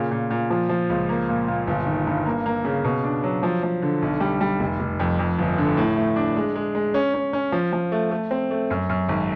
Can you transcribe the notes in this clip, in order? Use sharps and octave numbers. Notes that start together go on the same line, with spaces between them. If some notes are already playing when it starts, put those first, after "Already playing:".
Already playing: A#2 C#3
A#2
A#2
F3
F3
C#2
A#3
A#2
A#2
G1
D#3
G2
A#3
A#3
C#3
B2
D4
F#3
F3
F3
D3
B1
G3
G3
F1
F1
F2
F2
G1
D3
A2
A3
D4
G#3
G#3
G#3
C#4
C#4
C#4
F3
F3
A3
A3
C4
A3
F#2
F#2
G#1